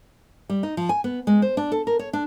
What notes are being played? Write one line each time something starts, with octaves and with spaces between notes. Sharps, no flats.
G3
D#4
F3
G#5
B3
G#3
C5
D4
A4
A#4
C#5
D4